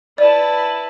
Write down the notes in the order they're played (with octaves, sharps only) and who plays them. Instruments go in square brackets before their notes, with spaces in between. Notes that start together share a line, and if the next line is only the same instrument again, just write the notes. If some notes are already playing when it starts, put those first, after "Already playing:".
[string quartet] E4 B4 A5 [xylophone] D5